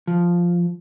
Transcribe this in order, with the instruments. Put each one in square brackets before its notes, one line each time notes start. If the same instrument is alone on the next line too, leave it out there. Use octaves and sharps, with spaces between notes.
[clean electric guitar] F3